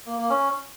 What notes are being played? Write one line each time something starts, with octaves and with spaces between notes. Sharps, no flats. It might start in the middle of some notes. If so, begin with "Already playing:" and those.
A#3
A#3
C#4